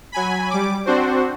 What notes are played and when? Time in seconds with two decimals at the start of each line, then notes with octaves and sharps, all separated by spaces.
0.12 F#3 G#5 B5
0.50 G3 D6
0.86 C4 D4 F#4 C5